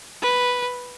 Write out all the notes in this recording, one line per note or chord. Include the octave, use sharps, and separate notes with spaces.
B4